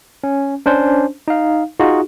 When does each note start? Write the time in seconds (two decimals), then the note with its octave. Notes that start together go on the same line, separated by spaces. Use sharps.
0.24 C#4
0.66 C#4 D4 C5
1.28 D#4 F5
1.80 D#4 F4 F#4 G#4